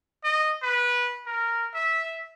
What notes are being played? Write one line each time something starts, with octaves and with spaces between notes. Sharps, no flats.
D#5
B4
A#4
E5